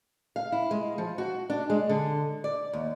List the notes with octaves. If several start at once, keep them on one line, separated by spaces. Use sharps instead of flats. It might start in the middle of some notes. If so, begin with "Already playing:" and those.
F5
E4
G#3
F3
F#4
D4
G#3
D3
D5
D#2